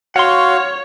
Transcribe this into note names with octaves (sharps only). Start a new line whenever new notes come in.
F#4 C#5 F5 F#5 C6